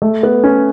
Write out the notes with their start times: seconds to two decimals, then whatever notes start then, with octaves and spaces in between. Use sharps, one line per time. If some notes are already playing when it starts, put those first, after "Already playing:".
0.02 A3
0.23 B3
0.44 C#4